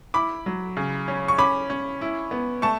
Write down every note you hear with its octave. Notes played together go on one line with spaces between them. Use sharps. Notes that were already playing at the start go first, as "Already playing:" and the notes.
E4 B5 D6
F#3
C#3
C#4
C#6
C#4 B5 D6
C#4
E4
B3
A3 A5 C#6